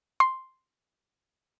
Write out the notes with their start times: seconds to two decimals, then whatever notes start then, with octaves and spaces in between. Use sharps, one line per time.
0.20 C6